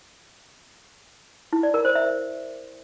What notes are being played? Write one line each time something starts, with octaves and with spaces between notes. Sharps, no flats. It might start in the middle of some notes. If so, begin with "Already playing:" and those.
E4
D5
A#4
C5
E5